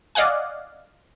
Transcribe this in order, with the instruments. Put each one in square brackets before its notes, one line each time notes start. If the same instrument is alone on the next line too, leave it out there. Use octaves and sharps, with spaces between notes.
[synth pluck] D5 D#5 F5 F#5 G#5